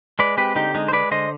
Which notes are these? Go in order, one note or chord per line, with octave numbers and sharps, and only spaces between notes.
G#3 B4 D5
C4 G4 B4
D3 D#4 G4
G#3 D#4
C5
G#3 B4 D5
D3 C5 D#5